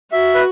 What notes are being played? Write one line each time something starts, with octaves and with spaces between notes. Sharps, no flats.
F#4 E5
B4